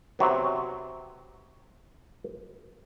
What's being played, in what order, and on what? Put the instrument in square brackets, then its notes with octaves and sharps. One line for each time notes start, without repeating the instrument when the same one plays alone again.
[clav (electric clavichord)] C3 F#3 B3